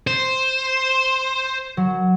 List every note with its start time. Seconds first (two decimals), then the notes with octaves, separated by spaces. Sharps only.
0.07 C5
1.77 F#3